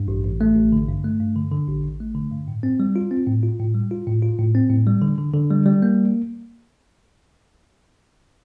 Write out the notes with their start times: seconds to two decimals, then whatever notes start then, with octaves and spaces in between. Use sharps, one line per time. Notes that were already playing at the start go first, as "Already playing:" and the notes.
Already playing: G2
0.08 A1
0.25 A1
0.41 A3
0.56 A1
0.72 D3
0.89 G2
1.04 A3
1.20 G2
1.36 D3
1.51 D3
1.68 A1
1.84 A1
2.00 A3
2.15 D3
2.31 G2
2.48 A2
2.63 C4
2.80 G3
2.96 F4
3.11 C4
3.27 A2
3.43 F4
3.59 A2
3.74 G3
3.91 F4
4.07 A2
4.22 F4
4.39 A2
4.55 C4
4.70 A2
4.87 G3
5.02 D3
5.18 D3
5.34 D3
5.51 G3
5.66 G3
5.82 A#3